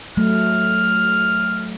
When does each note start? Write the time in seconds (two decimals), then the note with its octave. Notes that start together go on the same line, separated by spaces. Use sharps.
0.17 F#3 A3 F6